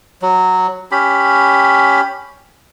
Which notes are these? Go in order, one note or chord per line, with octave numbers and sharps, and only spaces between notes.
F#3
C#4 G4 B5